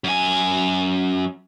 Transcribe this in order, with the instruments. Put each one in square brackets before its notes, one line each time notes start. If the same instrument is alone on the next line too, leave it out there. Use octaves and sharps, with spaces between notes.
[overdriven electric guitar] F#2 G#5